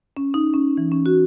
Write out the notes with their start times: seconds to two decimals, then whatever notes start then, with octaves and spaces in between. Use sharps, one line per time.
0.17 C#4
0.34 D#4
0.54 C#4
0.77 E3
0.92 C#4
1.06 F#4